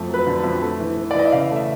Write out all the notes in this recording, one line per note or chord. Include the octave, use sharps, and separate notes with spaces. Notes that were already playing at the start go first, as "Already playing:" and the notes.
Already playing: F2 A3
F#3
B4
D3
F2
A3
E3
E3
D5
E3 D#5
E5
C#3 F5
A3
E5